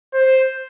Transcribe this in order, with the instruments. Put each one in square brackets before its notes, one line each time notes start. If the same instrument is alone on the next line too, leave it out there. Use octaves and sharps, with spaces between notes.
[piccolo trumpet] C5